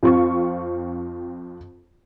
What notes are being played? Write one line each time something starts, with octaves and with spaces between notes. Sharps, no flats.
F2 C4 F4 C#6